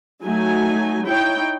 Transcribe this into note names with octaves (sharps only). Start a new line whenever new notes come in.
F#3 A3 D#4 G#5
D#4 E4 C#5 G5